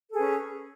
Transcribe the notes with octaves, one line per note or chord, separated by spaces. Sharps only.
C#4 G#4 A4 B4